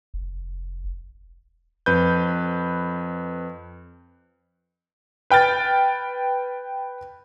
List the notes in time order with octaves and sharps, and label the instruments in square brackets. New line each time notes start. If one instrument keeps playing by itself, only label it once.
[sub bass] F1
[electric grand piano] F2 B4 G6
[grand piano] B4 G5 F6 A6